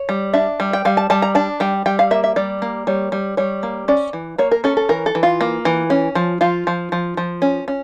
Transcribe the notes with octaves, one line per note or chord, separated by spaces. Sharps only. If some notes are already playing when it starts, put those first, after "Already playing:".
Already playing: C#5
G3
D4 E5
G3
G5
G3 F5
A5
G3 A5
A#5
D4 A5
G3 G5
G3 G5
F5
A#3 E5
E5
G3 D5
A#3
G3 C#5
G3
G3 C#5
A#3
C#4 D5
E3
A#3 C#5
A#4
C#4 A4
A4
E3 A#4
A4
E3
F4
A#3
E3
C#4
F3
F3 F4
F3
F3
F3
C#4
C#4